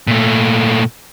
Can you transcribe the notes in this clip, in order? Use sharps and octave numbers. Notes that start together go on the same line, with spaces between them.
A#2 A3